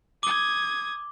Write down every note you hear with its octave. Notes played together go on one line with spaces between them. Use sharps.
D6 D#6 G#6 G7